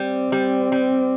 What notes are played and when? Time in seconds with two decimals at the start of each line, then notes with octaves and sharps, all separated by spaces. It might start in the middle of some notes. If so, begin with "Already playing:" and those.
Already playing: G3 C4
0.32 G3
0.72 G3